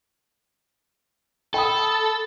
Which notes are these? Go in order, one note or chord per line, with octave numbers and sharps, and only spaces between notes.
A4 G5 B5 D#6